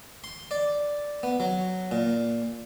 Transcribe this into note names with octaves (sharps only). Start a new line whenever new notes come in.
C6
D5
B3
F#3
A#2